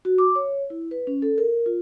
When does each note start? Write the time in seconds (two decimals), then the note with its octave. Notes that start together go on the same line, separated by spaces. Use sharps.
0.05 F#4
0.18 D6
0.35 C#5
0.70 E4
0.91 B4
1.07 C#4
1.22 A4
1.38 A#4
1.66 F4